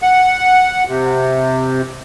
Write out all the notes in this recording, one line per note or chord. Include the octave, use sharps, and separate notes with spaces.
F#5
C3